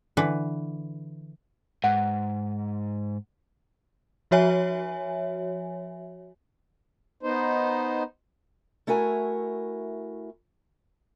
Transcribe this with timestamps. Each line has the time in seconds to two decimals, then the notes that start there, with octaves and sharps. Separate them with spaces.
0.17 D3 E3 B4
1.84 G#2 F#5
4.31 F3 F#4 C#5 E5 G#5
7.23 B3 D#4 C5
8.87 A3 E4 F#4 A#4 G#5